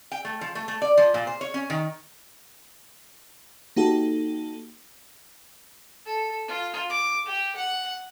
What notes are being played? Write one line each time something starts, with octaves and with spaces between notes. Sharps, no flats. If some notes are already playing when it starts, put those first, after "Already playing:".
G5
A3
F3
A3
A3
D5
F3
A#2
C5
C#5
C#4
D#3
A#3 D#4 F#4 G4 A4
A4
F4
D6
G4
F#5